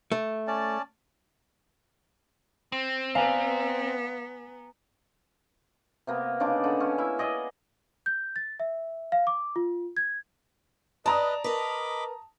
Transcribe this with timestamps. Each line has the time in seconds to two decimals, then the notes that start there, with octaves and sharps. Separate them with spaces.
0.12 A3
0.47 C#4 D5 A5
2.72 C4
3.15 B3 B4 D5 F5 G#5 A#5
6.07 C3 A#3 B3
6.40 C#3 D4 D#4 D6
6.64 D3
6.80 C#4 G4
6.98 E4 E5
7.18 G#4 D5 D#5 F#5
8.06 G6
8.36 A6
8.60 E5
9.12 F5
9.27 D6
9.56 F4
9.97 G#6
11.06 B4 D5 D#5 A5 A#5 D#6
11.44 A#4 B4 D#5 B5 D6